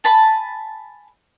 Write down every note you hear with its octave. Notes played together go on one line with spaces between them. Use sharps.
G#5 A5 B5